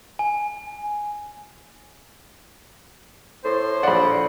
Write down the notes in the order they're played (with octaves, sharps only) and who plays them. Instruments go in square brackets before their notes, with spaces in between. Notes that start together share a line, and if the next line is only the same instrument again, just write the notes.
[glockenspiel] G#5
[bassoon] A2 [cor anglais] C5
[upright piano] A#1 F#5 [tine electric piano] D5 B5